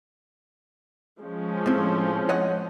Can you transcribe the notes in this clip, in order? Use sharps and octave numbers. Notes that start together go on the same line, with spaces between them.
F3 G#3 C#4
A2 C4
C#5 D#5 F#5